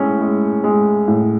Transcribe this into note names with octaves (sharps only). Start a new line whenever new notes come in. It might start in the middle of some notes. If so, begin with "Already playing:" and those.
Already playing: A2 G#3 C#4
G#3
G#3
A2